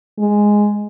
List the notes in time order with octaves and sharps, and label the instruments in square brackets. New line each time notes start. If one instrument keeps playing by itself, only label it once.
[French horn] G#3